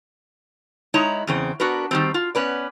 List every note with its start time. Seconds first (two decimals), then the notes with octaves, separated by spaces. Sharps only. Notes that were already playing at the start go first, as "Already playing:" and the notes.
0.94 G#3 D#4 E4 C#5 A#5
1.27 E2 C#3 C4
1.60 B3 D4 F#4 A#4 B4
1.91 D#3 G3 C4
2.14 F4
2.35 B3 C#4 B4 D5